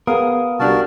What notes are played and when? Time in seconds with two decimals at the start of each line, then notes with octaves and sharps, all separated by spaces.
0.07 B3 G#4 A#4 F5 D#6
0.59 C2 D4 F#4 G4 A#4 A5